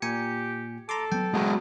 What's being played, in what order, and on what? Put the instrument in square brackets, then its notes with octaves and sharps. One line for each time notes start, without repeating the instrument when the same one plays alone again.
[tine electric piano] A#2 G#5 C#7 [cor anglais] G4
[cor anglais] A4 [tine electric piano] A#5 C6 D6
[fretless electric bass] F#3 B3 [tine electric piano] G5
[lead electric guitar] G#3 F#4